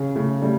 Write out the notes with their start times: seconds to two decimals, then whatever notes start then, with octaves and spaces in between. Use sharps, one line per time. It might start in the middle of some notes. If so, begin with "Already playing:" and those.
Already playing: C#3
0.16 C#3 A3
0.42 G3 A3